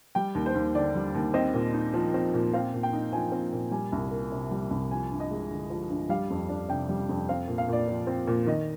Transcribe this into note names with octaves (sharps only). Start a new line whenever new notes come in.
G3 G5
D#2
C5
D#2
D3 D5
G3
D#2
C4 D#5
A#2
D#4
F3
C4
A#2
C4 F5
A#2
G5
D#4
F3 G#5
C4
A#2
G3 G#5
C2
A#3
C3
G3
C2
F3 G#5
G2
D#5
G#3
D3
F3
G2
G3 F5
F2
D4
C3 G5
G3
F2
C4 F5
A#2
F5
A#2 D5
F3
C4
A#2
D#3 D#5